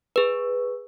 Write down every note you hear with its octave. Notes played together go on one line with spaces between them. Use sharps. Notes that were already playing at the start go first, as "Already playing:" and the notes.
G#4 B4